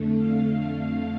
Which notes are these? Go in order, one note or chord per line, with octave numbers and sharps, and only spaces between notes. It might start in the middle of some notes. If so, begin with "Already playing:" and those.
Already playing: F2 D3 A3
F5